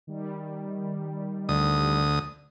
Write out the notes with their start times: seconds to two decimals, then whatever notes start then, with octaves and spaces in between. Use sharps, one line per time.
0.07 D#3 G3
1.49 D2 D#6